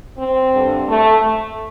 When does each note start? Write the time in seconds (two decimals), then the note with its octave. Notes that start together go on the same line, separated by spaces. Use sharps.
0.17 C4
0.53 G2 D3
0.88 A3